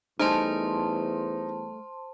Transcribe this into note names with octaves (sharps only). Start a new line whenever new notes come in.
E2 G3 A3 D#4 C5 G#5 A5 C6